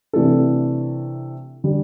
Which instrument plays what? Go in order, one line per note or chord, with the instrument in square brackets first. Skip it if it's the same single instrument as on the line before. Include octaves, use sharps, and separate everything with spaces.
[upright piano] C3 E3 A3 D4 A4
D3 G3 D4